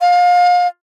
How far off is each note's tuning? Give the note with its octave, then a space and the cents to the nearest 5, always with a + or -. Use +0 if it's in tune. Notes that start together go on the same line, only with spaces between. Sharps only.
F5 +30